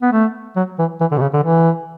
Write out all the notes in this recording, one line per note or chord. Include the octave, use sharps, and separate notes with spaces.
B3
A3
F#3
E3
E3
D3
B2
C#3
D3
E3